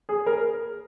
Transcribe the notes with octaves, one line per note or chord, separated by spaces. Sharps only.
G#4
A#4